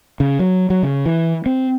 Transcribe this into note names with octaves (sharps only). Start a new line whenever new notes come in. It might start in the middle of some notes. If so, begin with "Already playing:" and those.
C#3
F#3
F#3
C#3
E3
C4